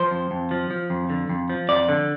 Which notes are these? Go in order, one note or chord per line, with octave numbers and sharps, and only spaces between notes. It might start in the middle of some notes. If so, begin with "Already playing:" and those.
Already playing: F3 C5
F2
F2
F3
F3
F2
D3
F2
F3
F2 D5
D3